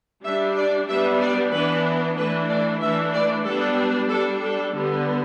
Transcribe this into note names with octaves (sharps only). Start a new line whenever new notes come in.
G3 D4 E5
D5
G3 B3 D4 E5
D5
E3 B3 D4 B4
E3 A3 D4 B4
D5
E3 A3 D4 E5
D5
G3 B3 D4 A4
G3 D4 A4
A4
D3 G3 B3